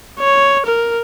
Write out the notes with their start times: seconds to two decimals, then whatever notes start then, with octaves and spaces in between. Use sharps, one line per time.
0.20 C#5
0.66 A#4